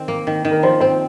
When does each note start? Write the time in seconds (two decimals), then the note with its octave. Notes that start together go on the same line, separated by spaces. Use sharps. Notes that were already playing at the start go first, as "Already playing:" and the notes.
Already playing: D#3 C4
0.08 A#3
0.27 D#3
0.45 D#3
0.51 A#4
0.63 F3 C5
0.80 C4 C5